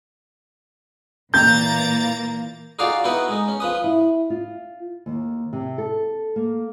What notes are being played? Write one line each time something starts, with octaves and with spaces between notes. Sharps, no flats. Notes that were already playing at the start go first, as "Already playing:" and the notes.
A#2 E3 A#3 A#5 G6 A6
D#4 F4 F#4 G#4 D5 F5
B3 D#4 E4 F#4 B4 F#5
G#3 D#4
C#4
F3 B4 D#6
E4
F4
D#2
C3
A4
A#3